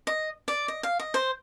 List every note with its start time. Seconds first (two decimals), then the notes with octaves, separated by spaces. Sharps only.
0.07 D#5
0.48 D5
0.68 D#5
0.83 F5
0.99 D#5
1.14 C5